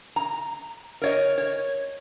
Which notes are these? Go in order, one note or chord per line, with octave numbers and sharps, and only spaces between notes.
A#5
A#4 C#5 D#5
C#5